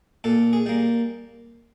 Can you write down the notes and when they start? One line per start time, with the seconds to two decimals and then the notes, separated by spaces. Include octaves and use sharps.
0.24 A#2 A4
0.53 G#4
0.66 G3 A#3